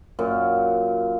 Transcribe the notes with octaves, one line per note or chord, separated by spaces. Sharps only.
F#2 A#2